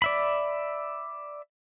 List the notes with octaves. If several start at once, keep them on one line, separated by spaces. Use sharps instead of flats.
D5 E5 B5